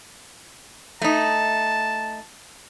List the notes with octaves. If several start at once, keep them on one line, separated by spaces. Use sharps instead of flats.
A3 D#4 A5